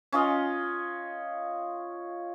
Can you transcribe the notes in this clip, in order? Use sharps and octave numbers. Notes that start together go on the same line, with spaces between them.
C#4 F4 D#5